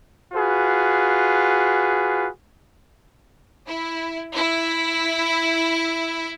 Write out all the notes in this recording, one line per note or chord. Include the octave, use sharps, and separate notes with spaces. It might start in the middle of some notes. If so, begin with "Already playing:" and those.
F4 F#4 G#4 B4
E4
E4